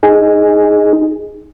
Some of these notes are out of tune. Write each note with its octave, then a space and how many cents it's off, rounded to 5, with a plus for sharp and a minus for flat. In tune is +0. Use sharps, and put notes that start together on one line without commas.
D#4 +0 G#4 +0